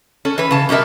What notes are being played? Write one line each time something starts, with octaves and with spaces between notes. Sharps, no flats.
C#4 A4
E3 B4
C#3 A5
B2 G3 D#4 A#4 E5